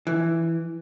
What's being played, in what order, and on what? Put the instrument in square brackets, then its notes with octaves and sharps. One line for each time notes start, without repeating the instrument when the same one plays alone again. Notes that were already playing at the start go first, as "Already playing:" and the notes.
[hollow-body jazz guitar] E3